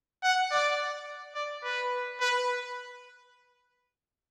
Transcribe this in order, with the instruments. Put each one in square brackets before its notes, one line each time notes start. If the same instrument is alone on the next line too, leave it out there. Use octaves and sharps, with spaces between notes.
[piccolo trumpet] F#5
D5
D5
B4
B4